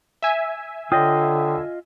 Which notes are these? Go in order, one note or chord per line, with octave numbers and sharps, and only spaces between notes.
E5 G#5
D3 F4 C#5 D#5 G5 D#6